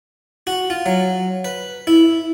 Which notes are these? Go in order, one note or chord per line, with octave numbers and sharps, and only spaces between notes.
F#4
F4
F#3
B4
E4